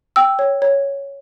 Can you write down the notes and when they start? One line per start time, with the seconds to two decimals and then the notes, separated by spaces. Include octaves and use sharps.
0.16 G5 E6
0.39 C#5
0.62 C#5